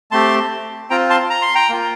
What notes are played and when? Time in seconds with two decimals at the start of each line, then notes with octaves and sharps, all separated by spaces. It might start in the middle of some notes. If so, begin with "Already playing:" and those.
0.11 A3 C4 G4 A5 C6
0.90 C4 F4 G5 A#5
1.10 A5 C6
1.30 A#5
1.42 C6
1.55 G5 A#5
1.69 A#3 F4